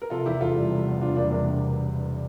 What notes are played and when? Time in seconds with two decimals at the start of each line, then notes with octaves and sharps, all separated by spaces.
0.02 A#4
0.10 C3 F4 A4
0.26 E2 E4 G4
0.41 E1 F4 A4
0.56 G3
0.71 C3
0.86 E2
1.01 E1 D4 F4
1.16 G3 A#3 D4
1.31 C3 A#3 D4